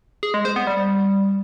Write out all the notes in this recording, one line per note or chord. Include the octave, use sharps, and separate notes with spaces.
G#4
G#3
C5
B3
G3